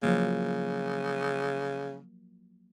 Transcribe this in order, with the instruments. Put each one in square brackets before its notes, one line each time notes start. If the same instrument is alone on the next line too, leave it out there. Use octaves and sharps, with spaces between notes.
[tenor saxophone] C#3 [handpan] F3 F#3 A#3